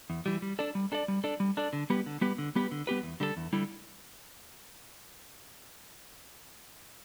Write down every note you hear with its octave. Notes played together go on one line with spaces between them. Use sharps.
E2
E3 G3
G3
D4 A4 D5
G3
D4 A4 D5
G3
D4 A4 D5
G3
D4 A4 D5
D3
G3 B3 G4 B4
D3
G3 B3 G4 B4
D3
G3 B3 G4 B4
D3
G3 B3 G4 B4
E2
D3 G3 E4 A4
E2
D3 G3 E4 A4